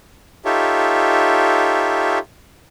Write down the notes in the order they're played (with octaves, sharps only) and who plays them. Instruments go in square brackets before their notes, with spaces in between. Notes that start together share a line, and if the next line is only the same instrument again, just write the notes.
[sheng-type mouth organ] D#4 F4 G4 A4 C#5 E5